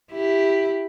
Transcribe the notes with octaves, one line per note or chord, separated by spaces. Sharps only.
E4 G4